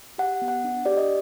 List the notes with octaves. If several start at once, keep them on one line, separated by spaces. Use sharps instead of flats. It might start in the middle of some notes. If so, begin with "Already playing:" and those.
G4 F#5
B3
F#5
D4
G4 D5
D#5